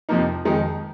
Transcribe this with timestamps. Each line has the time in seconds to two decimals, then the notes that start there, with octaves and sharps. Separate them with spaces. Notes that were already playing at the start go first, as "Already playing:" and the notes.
0.09 F2 C3 F3 A#3 D#4
0.45 F2 D#3 G#3 D#4